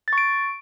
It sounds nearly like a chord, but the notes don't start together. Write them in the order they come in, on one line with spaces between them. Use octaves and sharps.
A6 C#6 D7